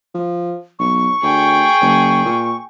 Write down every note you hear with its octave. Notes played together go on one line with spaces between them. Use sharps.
F3
B1 C#6
D2 G#4 G5
F#1
A#2